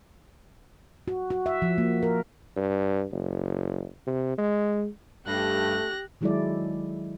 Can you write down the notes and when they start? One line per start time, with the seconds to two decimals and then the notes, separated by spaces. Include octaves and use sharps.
1.08 F#4
1.30 F#4
1.46 E5
1.62 F3
1.78 A#3
2.03 A#4
2.56 G2
3.11 F#1
4.07 C3
4.38 G#3
5.27 G2 A3 G4 F#6 A#6
6.21 D#3 F#3 G#3 E4 A4 D5